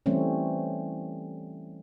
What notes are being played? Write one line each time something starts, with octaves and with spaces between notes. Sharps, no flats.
E3 G3 A3 C4 C#4